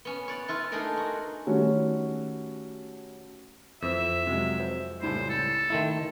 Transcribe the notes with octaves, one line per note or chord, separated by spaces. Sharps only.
B3 C#4
C#5 D5 F#5
E4 F4 B4
A3 A#3 D4 D#4 G#4 A#4
F#4
D#3 G3 A3 C#4 F#4
F2 E3 C4 E5
C3 F#3 G#3
C5
C#2 A2 G3 C5
A4
D#3 A3 E4 E5 C6